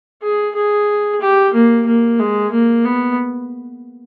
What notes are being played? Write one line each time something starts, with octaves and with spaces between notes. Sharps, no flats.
G#4
G#4
G4
A#3
A#3
G#3
A#3
B3